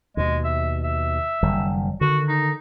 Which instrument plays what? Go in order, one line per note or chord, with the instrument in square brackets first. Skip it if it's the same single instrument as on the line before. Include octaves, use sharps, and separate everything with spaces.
[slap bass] D#2 B2 [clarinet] G#3
[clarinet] E5
E5
[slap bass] F#1 D#3 G3
[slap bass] D3 D#3 [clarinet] F#4
[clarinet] D#4